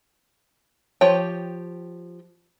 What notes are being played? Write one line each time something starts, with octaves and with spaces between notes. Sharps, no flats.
F3 G4 C#5 G5